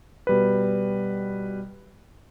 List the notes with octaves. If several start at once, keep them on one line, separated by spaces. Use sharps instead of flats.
B2 G3 B4